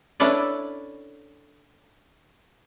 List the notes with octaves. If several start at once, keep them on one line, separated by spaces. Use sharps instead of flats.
C#4 D4 E4 A4 B4 D5